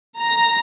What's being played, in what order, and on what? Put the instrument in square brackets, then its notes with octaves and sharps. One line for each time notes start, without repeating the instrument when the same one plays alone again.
[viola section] A#5